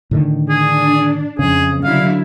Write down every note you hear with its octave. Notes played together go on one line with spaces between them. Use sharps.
A2 D3 D#3
D4 G#4
F2 C#3 G#4
D3 F#3 E4 F5